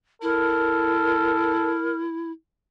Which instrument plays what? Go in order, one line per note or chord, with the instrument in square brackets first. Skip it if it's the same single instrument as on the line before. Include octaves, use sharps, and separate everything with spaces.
[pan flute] E4 [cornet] A4 [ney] A#4